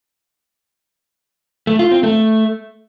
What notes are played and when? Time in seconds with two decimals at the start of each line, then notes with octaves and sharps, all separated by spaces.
1.67 A3
1.79 F4
1.91 C4
2.03 A3